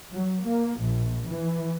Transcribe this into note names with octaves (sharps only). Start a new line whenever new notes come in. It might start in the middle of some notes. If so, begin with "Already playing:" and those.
F#3
A#3
A#1
E3